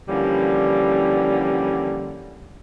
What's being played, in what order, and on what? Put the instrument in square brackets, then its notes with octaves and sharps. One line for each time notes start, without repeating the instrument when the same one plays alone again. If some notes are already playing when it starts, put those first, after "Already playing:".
[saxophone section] D3 E3 F3 G3 A#3 C#4